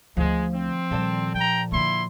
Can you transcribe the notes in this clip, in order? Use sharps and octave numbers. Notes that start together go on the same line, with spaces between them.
D2 D3 F3 G#3
C4
A#2 D#3 G3 A4 D5
F3 G5 A#5
D3 A#3 E4 C6